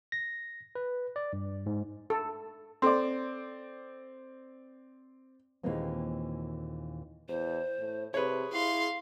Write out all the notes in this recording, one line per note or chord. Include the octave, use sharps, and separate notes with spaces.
A#6
B4
D5
G2
G#2
A4
C4 A4 D5 C6
D#2 A#2 E3 G#3 A#3 C4
E2 C5
A2
C3 G#4 B4 C#5
E4 F5 C6